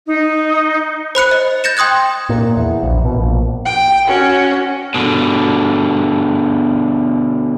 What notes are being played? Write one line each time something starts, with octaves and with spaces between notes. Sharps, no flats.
D#4
C5 B5 F#6 C#7
D#5
G6 A6 A#6 C#7 E7
G5 C6 D#6 F#6 G#6
A#2
E2
A#1
B2
A#1
G5
C#4 F#4
B2 D3